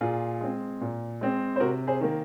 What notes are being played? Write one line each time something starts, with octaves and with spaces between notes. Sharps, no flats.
A#2 F4 G#4
G#3 C4
A#2
G#3 C4
C5
C3 F#4 A#4
G#4 C5
D#3 A#3